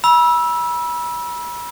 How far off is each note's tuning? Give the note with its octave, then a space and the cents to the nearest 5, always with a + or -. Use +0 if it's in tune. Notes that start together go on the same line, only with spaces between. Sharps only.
B5 -35 E6 +0